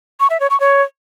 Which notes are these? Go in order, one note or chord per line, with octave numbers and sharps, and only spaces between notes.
C#6
E5
C#5
C#6
C#5